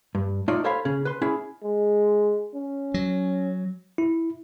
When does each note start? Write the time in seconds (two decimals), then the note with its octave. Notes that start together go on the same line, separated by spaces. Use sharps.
0.15 G2
0.48 A3 D#4 F4 C#5 D5
0.64 A4 C5 C#5 F5 B5
0.85 C#3 C#4 G#4
1.05 B4 C6
1.22 C#4 E4 G#4
1.63 G#3
2.54 C#4
2.94 F#3
3.98 E4